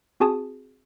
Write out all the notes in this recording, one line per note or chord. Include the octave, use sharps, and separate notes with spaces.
C4 F#4 G#4 G#5 A5 D#6